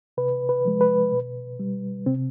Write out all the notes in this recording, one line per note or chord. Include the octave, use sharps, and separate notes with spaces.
C3 B4
B4
F3 G#3
B4
B2
G3
C3 C4